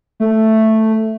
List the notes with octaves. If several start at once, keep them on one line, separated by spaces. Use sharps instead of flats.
A3